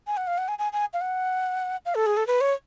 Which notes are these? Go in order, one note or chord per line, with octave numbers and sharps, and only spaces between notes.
G#5
F#5
F5
F#5
G#5
G#5
G#5
F5
F#5
F5
A4
G#4
A4
B4
C#5